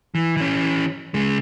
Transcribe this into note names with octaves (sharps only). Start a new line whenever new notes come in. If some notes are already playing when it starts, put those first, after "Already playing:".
E3
E3 C#4
C#3 G#3